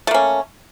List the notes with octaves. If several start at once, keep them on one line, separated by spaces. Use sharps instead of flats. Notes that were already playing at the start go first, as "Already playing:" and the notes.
A3 A#3 C#4